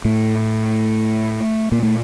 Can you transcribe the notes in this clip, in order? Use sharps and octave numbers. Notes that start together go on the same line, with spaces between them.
A2 A3
A#2 A#3
A3